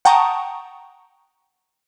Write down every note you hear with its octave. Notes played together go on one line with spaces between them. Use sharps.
F#5 G5 A5 A#5 C#6 D#6